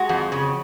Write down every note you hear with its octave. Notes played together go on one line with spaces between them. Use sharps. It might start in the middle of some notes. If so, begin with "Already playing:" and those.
Already playing: G#3 F#4
F2
C#3